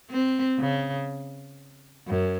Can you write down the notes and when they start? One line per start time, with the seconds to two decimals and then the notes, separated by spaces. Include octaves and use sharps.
0.10 C4
0.59 C#3
2.07 F#2